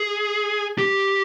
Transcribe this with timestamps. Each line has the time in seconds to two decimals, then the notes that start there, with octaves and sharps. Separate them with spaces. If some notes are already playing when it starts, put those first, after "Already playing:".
Already playing: G#4
0.78 G4